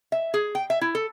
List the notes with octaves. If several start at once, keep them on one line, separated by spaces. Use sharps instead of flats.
E5
G#4
G5
E5
E4
A4